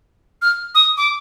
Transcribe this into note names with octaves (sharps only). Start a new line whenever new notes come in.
F6
D#6
D6